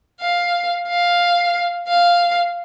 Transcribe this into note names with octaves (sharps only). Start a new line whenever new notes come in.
F5
F5
F5